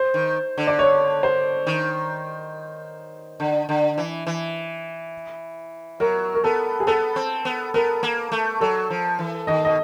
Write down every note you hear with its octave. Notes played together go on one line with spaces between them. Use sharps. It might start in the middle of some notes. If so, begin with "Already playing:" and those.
Already playing: C5
D#3
D3
D5
C#5
C5
D#3
D3
D3
E3
E3
F#3 A#4
A#4
B3 A4
G#4
B3 A4
C4
B3
B3 A#4
A#3
A3
F#3 A4
F3
E3
D#3 D#5
B2 D#5